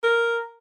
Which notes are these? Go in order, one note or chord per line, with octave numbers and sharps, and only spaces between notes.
A#4